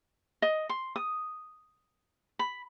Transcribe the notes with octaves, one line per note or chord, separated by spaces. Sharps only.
D#5
C6
D#6
B5